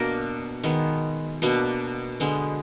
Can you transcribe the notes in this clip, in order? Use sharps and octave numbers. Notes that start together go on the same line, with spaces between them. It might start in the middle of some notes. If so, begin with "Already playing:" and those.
Already playing: B2 A#3 D4 A#4
D#3 G#3 B3
B2 A#3 D4 B4
D3 G#3 B3